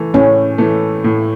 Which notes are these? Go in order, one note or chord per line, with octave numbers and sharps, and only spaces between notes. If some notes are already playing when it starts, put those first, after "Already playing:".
Already playing: E3 A3
A2 C#4
E3 A3
A2